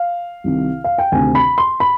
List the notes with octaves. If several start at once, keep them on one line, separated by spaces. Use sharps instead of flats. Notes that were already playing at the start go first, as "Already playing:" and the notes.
Already playing: F5
C2 C3 D#3
F5
G5
D2 C3 D#3 G#5
B5
C6
B5